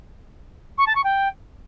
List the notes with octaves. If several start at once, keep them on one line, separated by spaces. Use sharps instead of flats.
C#6
A5
C#6
G5